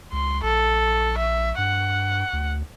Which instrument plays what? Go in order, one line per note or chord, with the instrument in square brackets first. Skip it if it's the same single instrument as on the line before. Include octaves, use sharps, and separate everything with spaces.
[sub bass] C#2 [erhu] C6
[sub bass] A#1 [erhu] A4
[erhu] E5
[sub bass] G2 [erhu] F#5
[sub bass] D2